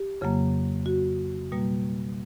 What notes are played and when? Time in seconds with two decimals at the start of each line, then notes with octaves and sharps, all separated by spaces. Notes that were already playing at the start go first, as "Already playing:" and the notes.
Already playing: G4
0.21 F2 C#3 F#3 A#3
0.86 F#4
1.52 B2 G3 A#3